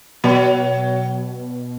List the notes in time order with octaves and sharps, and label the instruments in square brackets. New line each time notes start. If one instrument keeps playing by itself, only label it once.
[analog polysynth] B2 [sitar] F#3